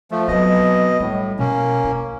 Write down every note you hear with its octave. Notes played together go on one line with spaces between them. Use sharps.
F3 A3
B2 F#3 C4 D#5
A2 G3
B2 A#3 C#4
E4